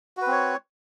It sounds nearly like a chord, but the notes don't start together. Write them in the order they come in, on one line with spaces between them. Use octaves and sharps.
F#4 B4 C4 C#5